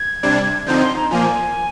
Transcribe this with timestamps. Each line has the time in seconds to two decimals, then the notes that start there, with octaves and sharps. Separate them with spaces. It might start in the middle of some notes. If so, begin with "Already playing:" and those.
Already playing: G#6
0.23 C3 G3 D4
0.66 D3 F3 C4 D#4 G6
0.82 C6
0.96 A#5
1.11 A#2 F3 A#3 G#5